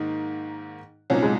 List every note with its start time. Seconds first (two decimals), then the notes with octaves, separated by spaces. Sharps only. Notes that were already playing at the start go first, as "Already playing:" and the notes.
Already playing: G#2 D#3 A#3 D#4
1.10 C2 A#2 F#3 C4 C#4 D#4
1.23 G#3